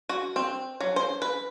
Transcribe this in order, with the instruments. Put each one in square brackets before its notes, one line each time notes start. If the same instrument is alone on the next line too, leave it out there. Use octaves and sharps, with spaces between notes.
[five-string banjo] F#4
C4
F#3
C5
B4